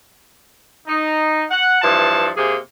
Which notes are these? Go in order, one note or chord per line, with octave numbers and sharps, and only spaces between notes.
D#4
F#5
G2 E3 F3 A5
C3 A#3 G#4